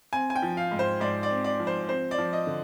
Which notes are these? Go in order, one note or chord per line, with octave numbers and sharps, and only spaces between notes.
C4 G#5
G#5
G5
F3
F5
G#2
C5
G#2 D5
D5
C4
D5
F3
C5
C4 C5
D5
F3
D#5
D3